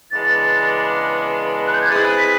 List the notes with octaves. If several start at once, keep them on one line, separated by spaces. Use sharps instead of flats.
C#3 E3 G#3 B3 D4 A6
F#6
G6
G#6
G#3 C4 E4 G#4 B4 A6
B6